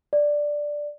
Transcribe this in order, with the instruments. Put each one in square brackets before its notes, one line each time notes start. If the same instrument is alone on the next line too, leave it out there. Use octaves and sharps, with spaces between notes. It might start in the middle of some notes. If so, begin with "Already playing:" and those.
[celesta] D5